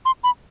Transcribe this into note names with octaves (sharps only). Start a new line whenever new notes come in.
C6
B5